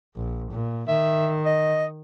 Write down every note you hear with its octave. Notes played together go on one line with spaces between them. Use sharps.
A#1
A#2
D#3 E5
D#5